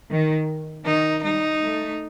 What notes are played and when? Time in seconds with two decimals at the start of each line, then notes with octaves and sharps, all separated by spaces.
0.10 D#3
0.85 D#3 D#4
1.23 G3 D#4
1.61 A3